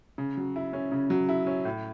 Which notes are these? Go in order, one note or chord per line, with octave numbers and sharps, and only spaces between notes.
C#3
F#3
E4
C#4
C#3
F#3
E4
C#4
A2